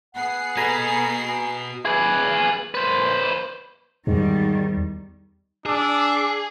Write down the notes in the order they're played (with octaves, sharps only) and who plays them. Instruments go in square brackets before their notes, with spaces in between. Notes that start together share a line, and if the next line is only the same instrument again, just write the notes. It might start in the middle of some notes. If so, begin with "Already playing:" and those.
[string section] B3 G#4 C7 [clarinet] F#5
[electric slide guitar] F#4 B4 [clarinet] A4 [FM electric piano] G#5 A#5 B5
[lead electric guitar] G#4 B4
B4 C5
[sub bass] E2 [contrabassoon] G#2 [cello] D#3 G3
[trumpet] D4 [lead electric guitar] G#4 [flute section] D6 E6